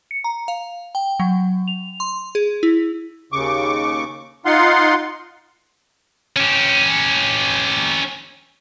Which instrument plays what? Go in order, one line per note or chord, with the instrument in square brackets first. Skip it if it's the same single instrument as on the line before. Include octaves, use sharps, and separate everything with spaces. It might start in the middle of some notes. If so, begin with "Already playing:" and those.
[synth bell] C#7
A#5
F5
G5
F#3
F7
C6
G#4
E4
[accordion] D#2 C#3 C#6 D6
D#4 F4 F5 F#5 C6
[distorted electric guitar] C#4 G4